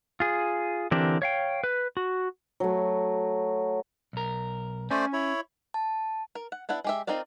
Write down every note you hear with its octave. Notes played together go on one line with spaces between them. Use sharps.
F4 G#4
D3 E3 C4 D4 G4 A#4
C#5 F5 G5
B4
F#4
F#3 A3
B1 A#4
A3 C#4 C5 D5 G#5
E4 C#5
A5
A#4
F#5
B3 D4 E4 F#5
G#3 G4 E5
C4 D#4 F4 A#4 D5